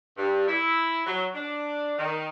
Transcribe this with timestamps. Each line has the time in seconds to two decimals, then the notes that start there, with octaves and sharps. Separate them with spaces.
0.17 G2
0.48 E4
1.06 F#3
1.35 D4
1.99 D#3